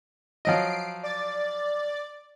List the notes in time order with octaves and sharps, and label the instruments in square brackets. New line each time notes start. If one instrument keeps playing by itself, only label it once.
[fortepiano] F3 F#3 D#5 [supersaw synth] C7 D7
[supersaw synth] D5 A6